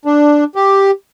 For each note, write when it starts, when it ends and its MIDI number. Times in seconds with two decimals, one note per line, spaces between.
0.05 0.44 62
0.55 0.91 67